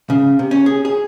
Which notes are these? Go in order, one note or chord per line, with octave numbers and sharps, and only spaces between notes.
C#3
C3
C#4
G#4
G#4